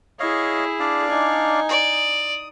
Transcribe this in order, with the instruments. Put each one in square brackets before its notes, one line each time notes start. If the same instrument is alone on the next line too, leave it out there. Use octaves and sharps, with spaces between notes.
[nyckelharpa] E4 G#4 [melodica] C#5 D#5 F5
[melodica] D4 D5 F5
[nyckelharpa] D#4 G#5
[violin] D5 [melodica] D#6